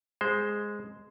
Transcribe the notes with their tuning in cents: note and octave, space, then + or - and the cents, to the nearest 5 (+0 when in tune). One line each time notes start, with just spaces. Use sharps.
G#3 +0 C5 +0